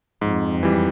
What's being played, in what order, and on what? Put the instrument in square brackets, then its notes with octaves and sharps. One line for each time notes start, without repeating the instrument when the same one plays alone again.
[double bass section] F2 [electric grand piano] G#2
[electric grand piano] E3 G3